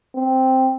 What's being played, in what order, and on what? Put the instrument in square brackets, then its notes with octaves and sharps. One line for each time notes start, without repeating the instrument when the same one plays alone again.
[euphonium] C4